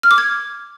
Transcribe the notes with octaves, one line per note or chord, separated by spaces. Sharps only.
F6
D6
G#6